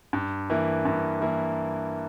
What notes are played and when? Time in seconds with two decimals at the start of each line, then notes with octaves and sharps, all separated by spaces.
0.13 G2
0.50 E3 A#3 E4
0.85 G2
1.21 E3 A#3 E4